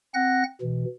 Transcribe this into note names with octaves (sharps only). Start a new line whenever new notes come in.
C4 F#5 F#6 A#6
B2 E3